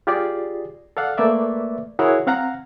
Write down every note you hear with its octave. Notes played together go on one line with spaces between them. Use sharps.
F4 G4 G#4 D5
A4 D5 F5 F#5
A3 A#3 B4 D5 E5
E4 F#4 G#4 A#4 C#5 F#5
C4 F5 F#5 A#5